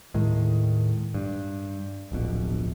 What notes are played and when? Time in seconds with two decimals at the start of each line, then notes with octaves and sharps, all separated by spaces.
0.14 D#2 A2 D#3 G#3
1.14 G2
2.12 D1 A#1 B2